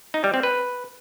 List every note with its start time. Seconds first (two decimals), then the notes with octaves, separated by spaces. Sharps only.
0.14 D#4
0.24 G3
0.34 C4
0.43 B4